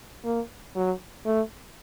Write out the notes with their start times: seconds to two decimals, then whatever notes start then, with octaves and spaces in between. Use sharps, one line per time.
0.25 A#3
0.76 F#3
1.26 A3